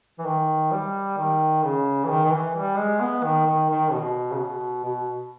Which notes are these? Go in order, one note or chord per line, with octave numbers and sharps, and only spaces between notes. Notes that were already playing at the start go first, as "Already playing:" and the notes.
E3
D#3
G3
D#3
C#3
E3
D#3
D#3
E3
G3
G#3
B3
D#3
D#3
D#3
B2
C#3
B2
B2